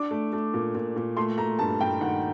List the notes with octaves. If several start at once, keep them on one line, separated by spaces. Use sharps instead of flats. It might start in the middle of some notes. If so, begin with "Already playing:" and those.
Already playing: D4 D6
A3
A3
A#2
A#2
A#2
A3 C6
A3 A#5
G2 A5
G2 G5
D#3 F#5